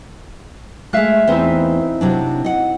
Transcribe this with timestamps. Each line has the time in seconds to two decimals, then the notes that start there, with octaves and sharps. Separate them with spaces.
0.93 G#3 A3 E5 F5 F#6
1.27 E2 C4 D#4 E4 B4
2.01 C3 F#3 D4
2.44 D#5 F#5